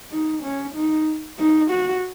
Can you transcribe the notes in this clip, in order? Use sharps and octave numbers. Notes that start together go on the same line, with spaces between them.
D#4
C#4
D#4
D#4
F#4